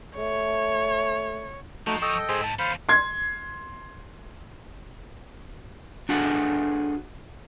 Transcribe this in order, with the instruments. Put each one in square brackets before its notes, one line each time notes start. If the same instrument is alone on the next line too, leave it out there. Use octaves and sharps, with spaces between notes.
[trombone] A3 [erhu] C#5
[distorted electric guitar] F3 [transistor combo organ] A3 [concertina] D#4 F#4
[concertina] A4 D#5 G5 [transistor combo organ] C#6 D#6
[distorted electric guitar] G#2 [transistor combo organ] G#4 C5
[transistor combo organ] A5
[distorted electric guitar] D#2 A4 [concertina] C5 F5 [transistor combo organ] B5
[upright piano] C6 G#6
[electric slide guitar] D4 F#4 G#4 A4 F#5